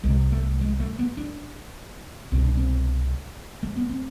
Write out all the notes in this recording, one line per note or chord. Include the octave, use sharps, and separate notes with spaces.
C2 C3 G#3
A3
G#3
A3
B3
D4
C2 B2 C4
D4
C4
A3
B3
C4